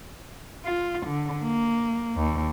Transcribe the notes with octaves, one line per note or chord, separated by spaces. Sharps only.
F4
D3
A#3
D#2